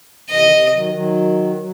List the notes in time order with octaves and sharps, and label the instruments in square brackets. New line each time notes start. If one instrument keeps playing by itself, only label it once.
[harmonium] C3 E3 [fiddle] D#5
[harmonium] D#3
C3
D#3 F#3
D#3 F#3
F#3